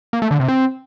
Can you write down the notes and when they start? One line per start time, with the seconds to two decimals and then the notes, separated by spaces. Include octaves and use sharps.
0.13 A#3
0.22 A3
0.31 D3
0.40 C3
0.48 C4